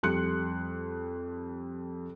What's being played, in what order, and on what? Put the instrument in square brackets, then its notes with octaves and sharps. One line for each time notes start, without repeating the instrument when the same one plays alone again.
[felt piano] F2 G3 G4 C6 F#6 C#7